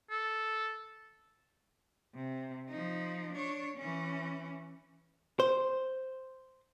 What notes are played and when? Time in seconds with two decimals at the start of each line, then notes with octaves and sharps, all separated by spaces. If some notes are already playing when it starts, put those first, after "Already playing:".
0.11 A4
2.15 C3
2.70 F3 D#4
3.34 D4 C#5
3.78 E3 C#4
5.40 C5